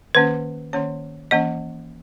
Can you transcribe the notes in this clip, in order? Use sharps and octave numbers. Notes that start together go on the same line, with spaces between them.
D#3 A#3 C#4 B4
D#3 A#3 C#4 C#5
E3 A#3 C#4 D#5